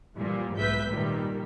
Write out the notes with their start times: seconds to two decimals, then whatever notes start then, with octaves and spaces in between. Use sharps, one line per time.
0.17 A#2 E3 F3 G3
0.57 B1 G#2 B4 E5 G6 B6
0.88 A#2 D#3 G3